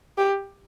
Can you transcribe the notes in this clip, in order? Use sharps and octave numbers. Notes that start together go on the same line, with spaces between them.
G4